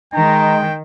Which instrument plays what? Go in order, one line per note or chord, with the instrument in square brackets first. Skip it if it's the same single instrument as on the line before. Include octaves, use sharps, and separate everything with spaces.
[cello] D#3 [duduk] G#3 [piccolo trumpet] G5 [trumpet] A#5